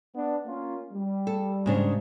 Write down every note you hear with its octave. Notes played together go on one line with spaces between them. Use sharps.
B3 D4
A#3 C#4 F4
G3
A4
G#2 C#3 D4